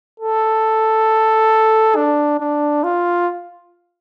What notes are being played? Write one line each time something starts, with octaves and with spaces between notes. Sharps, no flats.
A4
D4
D4
F4